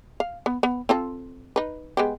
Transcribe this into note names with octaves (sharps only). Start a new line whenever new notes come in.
F5
B3
B3
C4 F4 A4
D#4 B4
G#3 B3 G4